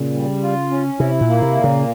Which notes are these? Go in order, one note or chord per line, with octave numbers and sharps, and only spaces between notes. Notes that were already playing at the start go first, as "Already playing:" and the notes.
Already playing: A#2 C#3
G3
F4
C#4
C3 E4
A#2
A#3
C3
A#2
C#3